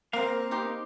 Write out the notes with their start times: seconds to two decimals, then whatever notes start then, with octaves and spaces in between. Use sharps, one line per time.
0.13 A#3 C4 A#4 F5
0.51 D#4 G4 C6